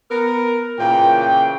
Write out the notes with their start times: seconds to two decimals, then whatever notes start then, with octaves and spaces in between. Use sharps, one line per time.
0.11 B3 A#4
0.79 A#2 C#3 E3 G5
1.21 G5